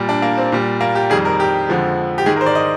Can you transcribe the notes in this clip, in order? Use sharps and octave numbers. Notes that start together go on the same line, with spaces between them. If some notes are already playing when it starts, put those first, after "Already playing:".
Already playing: A#2 G3
D4
A#3
C4
A#2 G3
A#3
G4
F2 D#3 G3 G#4
A#4
G4
F2 D3 F3 G#3
G4
G#2 D#3 G#3 G#4
A#4
C5
D5
D#5